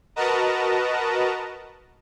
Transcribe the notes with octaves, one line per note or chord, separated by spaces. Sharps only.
F#4 A#4 B4 D#5 A5 A#5